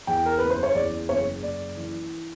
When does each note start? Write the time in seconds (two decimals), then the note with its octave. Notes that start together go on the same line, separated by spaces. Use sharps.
0.07 E2 G5
0.26 A#4
0.38 F#1 B4
0.50 C5
0.63 C#5
0.75 E2 D5
1.09 F#1 C#5
1.43 F#1 D5
1.76 E3